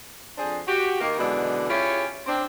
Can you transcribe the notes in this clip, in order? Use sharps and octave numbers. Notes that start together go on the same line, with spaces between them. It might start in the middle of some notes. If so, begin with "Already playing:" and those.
F2 D4 G#4 C5
F#4 G4
D#3 A#3
F#2 B2 D3 E3 G#3 D4
C#4 E4 F4 G4 G#4 C#5
C4 D4